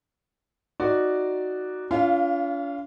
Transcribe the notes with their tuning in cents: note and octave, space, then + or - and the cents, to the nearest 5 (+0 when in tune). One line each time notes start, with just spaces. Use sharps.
D#4 +10 F#4 +0 D5 +0
C#4 +45 F4 -25 F5 +0